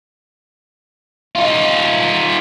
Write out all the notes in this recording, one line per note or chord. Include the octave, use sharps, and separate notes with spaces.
D#4 F4